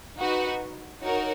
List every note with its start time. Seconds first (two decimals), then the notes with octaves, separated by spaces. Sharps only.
0.19 D#4 F#4 B4 F#5
1.03 D#4 F#4 A#4 C#5